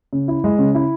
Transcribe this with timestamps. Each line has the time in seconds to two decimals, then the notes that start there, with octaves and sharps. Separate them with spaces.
0.13 C#3
0.28 E4
0.44 G#3
0.59 C#3
0.75 E4